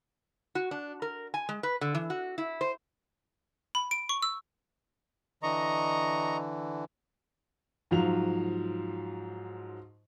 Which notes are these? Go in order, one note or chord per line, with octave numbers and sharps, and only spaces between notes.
F#4
D4
A#4
G#5
G#3
B4
D3
E3
F#4
E4
C5
B5
D7
C#6
E6
D3 E3 D#5 A#5 C#6
G#2 F3 F#3 F7